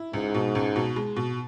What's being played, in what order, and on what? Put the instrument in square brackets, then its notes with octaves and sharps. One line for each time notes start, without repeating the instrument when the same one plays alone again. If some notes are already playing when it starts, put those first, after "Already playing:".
Already playing: [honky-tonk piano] E4
[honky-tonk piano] C#2 [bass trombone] G#2
[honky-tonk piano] B2
C#2
B2
G#3
B2